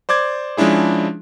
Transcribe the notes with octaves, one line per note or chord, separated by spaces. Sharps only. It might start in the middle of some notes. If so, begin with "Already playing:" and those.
C5 D5 D6 G#6
F3 G#3 C#4 D4 E4 G#4